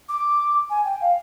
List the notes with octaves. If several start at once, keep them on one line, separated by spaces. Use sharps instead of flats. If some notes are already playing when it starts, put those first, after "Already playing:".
D6
G#5
G5
F5